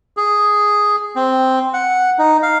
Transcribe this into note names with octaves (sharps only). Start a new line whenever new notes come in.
G#4
C4
F#5
D#4
F5